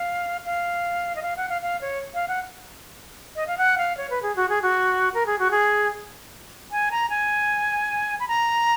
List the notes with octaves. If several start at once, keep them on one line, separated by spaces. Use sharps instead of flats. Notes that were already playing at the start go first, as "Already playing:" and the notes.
Already playing: F5
F5
D#5
F5
F#5
F5
F5
C#5
F5
F#5
D#5
F5
F#5
F5
C#5
B4
G#4
F#4
G#4
F#4
A#4
G#4
F#4
G#4
G#5
A#5
G#5
B5
A#5